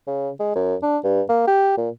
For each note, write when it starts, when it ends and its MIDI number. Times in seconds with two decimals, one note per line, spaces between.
0.07 0.30 49
0.39 0.55 56
0.55 0.75 42
0.82 0.97 62
1.04 1.22 43
1.29 1.46 58
1.47 1.73 67
1.77 1.89 46